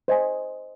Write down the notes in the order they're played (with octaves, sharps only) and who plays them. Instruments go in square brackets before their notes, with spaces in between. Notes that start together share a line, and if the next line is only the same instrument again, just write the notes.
[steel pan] C5 D#5 G#5